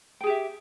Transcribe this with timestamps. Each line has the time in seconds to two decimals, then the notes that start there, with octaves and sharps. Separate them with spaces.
0.21 G5
0.24 G#4
0.27 G4
0.30 E5